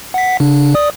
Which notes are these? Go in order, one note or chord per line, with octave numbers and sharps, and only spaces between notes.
F#5 B6
C#3 D4
D5 D#6